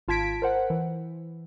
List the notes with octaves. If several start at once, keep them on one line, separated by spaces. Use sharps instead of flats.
G#1 F4 A5 G#6 B6 D7
A#4 C5 F#5
E3